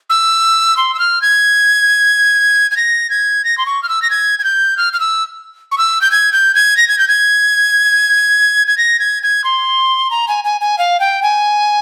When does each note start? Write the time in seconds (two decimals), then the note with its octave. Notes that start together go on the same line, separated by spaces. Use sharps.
0.10 E6
0.77 C6
0.94 E6
0.99 F6
1.22 G#6
2.71 G#6
2.77 A#6
3.10 G#6
3.44 A#6
3.58 C6
3.66 C#6
3.83 F6
3.89 E6
4.02 A#6
4.10 G#6
4.39 G#6
4.44 G6
4.77 F6
4.93 F6
5.00 E6
5.72 C#6
5.78 E6
6.01 G6
6.11 G#6
6.33 G6
6.55 G#6
6.77 A#6
6.88 G#6
6.99 G6
7.08 G#6
8.67 G#6
8.78 A#6
8.99 G#6
9.23 G#6
9.44 C6
10.11 A#5
10.28 G#5
10.44 G#5
10.61 G#5
10.78 F5
11.00 G5
11.23 G#5